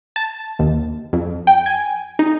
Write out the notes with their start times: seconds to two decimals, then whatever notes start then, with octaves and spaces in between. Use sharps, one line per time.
0.16 A5
0.59 D#2
1.13 F2
1.47 G5
1.66 G#5
2.19 D#4